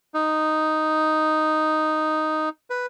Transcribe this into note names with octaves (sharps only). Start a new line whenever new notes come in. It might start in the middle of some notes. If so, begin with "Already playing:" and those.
D#4
B4